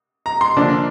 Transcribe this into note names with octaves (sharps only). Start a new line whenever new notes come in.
A#5
C6
D3 F3 A#3 D4